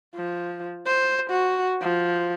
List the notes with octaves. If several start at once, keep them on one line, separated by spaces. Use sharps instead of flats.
F3
C5
F#4
F3